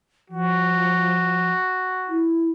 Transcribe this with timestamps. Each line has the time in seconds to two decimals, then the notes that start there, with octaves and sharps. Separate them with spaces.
0.30 F3 F#4
2.08 E4